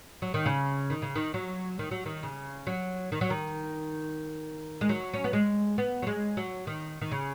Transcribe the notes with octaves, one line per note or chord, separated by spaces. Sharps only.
F#3
D#3
C#3
D#3
C#3
D#3
F#3
D#3
F#3
D#3
C#3
F#3
D#3
F#3
D#3
G#3
F#3
C#4
B3
G#3
B3
F#3
G#3
F#3
D#3
D#3
C#3